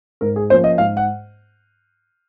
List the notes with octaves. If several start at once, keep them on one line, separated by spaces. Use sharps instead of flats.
G#2 A#4
G#4
F3 A#3 C#4 C5
D#5
G#2 F5
F#5